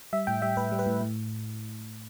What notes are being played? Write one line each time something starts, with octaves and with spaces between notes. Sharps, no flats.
G3 E5
A2 G5
G3 E5
A2 B4
G3
B4
A2
A2